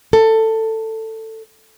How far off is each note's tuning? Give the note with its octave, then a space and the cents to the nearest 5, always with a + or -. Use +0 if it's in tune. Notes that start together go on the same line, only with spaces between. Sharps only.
A4 +15